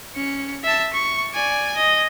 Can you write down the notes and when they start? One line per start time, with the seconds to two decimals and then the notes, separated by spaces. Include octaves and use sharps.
0.15 C#4 C#7
0.64 E5 A5
0.93 C#6
1.33 D5 G#5
1.76 D#5